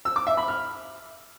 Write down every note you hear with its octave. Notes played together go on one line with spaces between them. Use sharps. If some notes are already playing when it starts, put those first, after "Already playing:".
E6
D6
E5
B5
F6